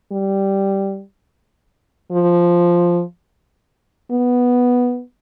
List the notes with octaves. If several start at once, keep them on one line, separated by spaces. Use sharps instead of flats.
G3
F3
B3